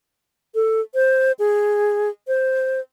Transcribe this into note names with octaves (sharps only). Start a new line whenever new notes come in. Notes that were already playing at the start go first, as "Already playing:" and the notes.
A4
C5
G#4
C5